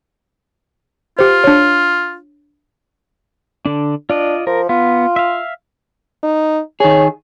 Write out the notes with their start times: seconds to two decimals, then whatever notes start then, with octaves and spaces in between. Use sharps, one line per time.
1.19 F4 G4 C5
1.44 D4 C#5
3.65 D3 D4
4.10 D4 F4 D5 D#5
4.47 F3 A#4
4.69 B3 F4
5.16 E5 F5
6.23 D#4
6.80 D#3 G#4 C#5